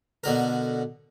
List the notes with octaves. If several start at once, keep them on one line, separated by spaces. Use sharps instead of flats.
B2 D3 A#4